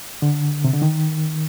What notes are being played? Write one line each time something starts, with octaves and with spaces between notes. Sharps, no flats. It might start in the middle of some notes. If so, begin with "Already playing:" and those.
D3
C3
D3
D#3